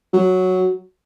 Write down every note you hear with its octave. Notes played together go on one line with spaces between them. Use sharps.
F#3